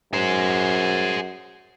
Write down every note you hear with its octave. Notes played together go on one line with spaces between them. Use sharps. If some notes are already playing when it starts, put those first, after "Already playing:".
F#2 G#4 C5